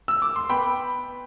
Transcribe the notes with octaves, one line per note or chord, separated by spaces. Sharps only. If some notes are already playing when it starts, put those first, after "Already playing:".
E6
D6
C6
B3 G5 B5